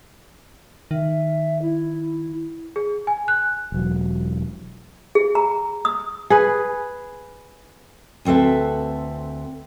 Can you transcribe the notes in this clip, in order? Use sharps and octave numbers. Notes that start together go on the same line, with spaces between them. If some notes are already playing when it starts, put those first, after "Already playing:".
D#3 E5
E4
G#4
G#5
F#6
E1 F#3
G#4
A#5
D#6
G#4 B4
D2 C4 A4 B4 E5